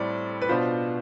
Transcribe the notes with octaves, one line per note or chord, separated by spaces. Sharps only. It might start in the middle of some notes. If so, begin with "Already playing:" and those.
Already playing: A2 G3 C4 D5
B4
B2 B3 D4 F4 C5